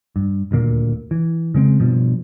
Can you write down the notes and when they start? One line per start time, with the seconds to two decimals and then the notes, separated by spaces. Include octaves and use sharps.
0.16 G2
0.51 D#1 D2 A#2 A#3
1.11 E3
1.54 C#3 G#3 A3 C4
1.80 G2 B2 F3